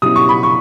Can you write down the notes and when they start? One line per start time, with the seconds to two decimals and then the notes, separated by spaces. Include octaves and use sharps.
0.02 B2 F#3 C#4 E4 D#6
0.16 C#6
0.29 B5
0.43 C#6